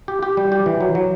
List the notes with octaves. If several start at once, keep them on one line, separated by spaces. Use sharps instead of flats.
G4
G4
G3
G4
E3
F#3
F#3